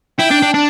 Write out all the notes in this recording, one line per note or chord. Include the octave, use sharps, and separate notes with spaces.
E4 G5
D4
D4
D4 A5